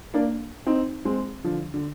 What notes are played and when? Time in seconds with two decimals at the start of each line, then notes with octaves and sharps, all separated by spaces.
0.14 A#3 D4
0.66 C4 D#4
1.05 G#3 C4
1.44 D3 F3
1.74 D3